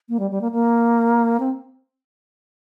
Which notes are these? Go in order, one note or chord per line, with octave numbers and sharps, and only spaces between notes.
A#3
G3
G3
A#3
A#3
C4